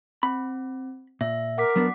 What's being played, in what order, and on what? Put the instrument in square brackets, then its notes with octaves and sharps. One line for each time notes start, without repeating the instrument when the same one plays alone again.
[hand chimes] C4 [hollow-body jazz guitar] B5
[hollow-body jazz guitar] A#2 [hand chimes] E5
[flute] A#4 [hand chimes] F#5 D6 B6
[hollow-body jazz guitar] F#3 B3 D4